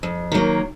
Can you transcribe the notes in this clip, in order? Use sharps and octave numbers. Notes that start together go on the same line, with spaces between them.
F2
D#3 F#3 A#3